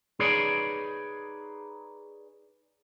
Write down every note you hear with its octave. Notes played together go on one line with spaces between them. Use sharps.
D#4 G#4 B4 C#5 D5